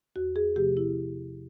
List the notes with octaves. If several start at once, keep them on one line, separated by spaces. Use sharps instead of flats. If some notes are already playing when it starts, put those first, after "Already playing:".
E2 F#4
G#4
C3 F3 A3 G4
E4